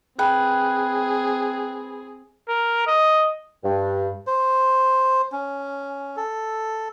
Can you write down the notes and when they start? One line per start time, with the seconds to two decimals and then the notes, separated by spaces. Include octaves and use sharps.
0.19 C4 G#4 B4 G5 F#6
2.48 A#4
2.87 D#5
3.64 G2
4.27 C5
5.32 C#4
6.17 A4